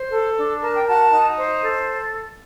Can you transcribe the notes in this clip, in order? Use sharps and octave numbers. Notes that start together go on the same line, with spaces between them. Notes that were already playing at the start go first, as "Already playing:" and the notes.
Already playing: C5
A4
D4
A#4 A5
G5
F#4 F#5 A5
D#4
C5
A4